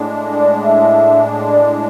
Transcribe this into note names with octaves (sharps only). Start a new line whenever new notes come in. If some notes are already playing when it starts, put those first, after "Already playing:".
Already playing: A2 G#3 D4
D5
E5
D5